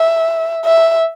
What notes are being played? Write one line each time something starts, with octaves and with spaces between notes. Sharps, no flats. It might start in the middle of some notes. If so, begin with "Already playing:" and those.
Already playing: E5
E5